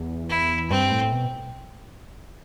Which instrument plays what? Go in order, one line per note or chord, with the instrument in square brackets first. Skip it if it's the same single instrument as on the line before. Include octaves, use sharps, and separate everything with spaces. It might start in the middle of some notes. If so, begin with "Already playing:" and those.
Already playing: [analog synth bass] E2
[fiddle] E4
[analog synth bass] G2 [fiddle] C4
[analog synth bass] A2
B2